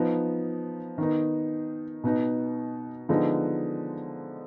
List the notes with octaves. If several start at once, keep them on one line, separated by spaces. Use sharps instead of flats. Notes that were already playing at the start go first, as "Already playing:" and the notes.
Already playing: F3 B3 D#4
D#3 B3 D#4
B2 B3 D#4
D3 F3 G#3 B3 D#4